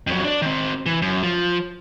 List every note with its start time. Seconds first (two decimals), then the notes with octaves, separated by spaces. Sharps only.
0.07 F2 F#3
0.23 D4 D5
0.42 D#3 C4
0.86 E3
1.02 F#2
1.23 F3